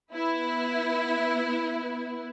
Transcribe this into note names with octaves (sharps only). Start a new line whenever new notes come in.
B3 E4 B4